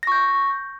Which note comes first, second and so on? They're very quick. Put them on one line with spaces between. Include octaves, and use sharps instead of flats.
A#6 C#6 G6